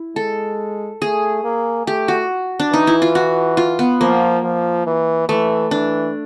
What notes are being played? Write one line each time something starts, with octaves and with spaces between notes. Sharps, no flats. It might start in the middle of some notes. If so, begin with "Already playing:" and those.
Already playing: E4
G#3 A4
A3 G#4
A#3
A3 G4
F#4
D4
E3 D#4
E4
F4
F#4
F4
B3
F3 A#3
F3
E3
E3 A3
E3 D4